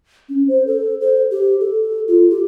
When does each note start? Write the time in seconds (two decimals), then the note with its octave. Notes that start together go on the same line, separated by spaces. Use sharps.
0.29 C#4
0.48 C5
0.67 A4
1.01 C5
1.31 G4
1.60 A4
2.08 F4
2.30 G4